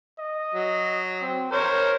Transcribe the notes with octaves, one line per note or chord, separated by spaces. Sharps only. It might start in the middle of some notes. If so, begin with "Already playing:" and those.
D#5
F#3
C4
A#4 C5 C#5